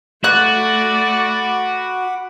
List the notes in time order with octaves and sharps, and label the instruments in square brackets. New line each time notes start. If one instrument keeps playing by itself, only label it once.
[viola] A3 D5 [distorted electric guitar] F#4 [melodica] F#5 B5 D6 [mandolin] F#6